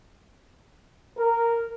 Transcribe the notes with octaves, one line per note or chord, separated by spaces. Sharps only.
A#4